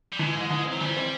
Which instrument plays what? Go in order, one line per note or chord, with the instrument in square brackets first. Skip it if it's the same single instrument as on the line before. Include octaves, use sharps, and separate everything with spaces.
[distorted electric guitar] G3
[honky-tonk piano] E3 [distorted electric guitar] G#3
[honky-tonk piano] G#2
E3
C4
[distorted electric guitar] F#3
[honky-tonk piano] E3 [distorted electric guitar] G3
[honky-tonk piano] C4